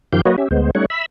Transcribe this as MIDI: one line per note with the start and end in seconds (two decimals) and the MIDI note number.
0.13 0.21 42
0.13 0.21 51
0.13 0.21 53
0.13 0.21 67
0.13 0.21 77
0.13 0.21 91
0.26 0.36 54
0.26 0.36 58
0.26 0.36 66
0.26 0.36 71
0.26 0.36 73
0.26 0.36 75
0.38 0.48 61
0.38 0.48 67
0.38 0.48 76
0.51 0.71 38
0.51 0.71 56
0.51 0.71 59
0.51 0.71 72
0.75 0.85 55
0.75 0.85 57
0.75 0.85 61
0.75 0.85 63
0.75 0.85 73
0.75 0.85 78
0.90 1.06 76
0.90 1.06 83
0.90 1.06 88